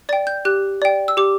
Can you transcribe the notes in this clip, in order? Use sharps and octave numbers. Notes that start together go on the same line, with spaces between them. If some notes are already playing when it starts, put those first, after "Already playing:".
D5 G5 A6
G6
G4 F#6
D5 G5
E6
G4 D6